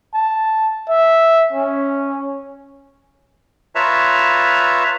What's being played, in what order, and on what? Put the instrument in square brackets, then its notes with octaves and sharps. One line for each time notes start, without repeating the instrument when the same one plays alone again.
[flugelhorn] A5
E5
C#4
[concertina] F4 B4 C#5 E5 A5 A#5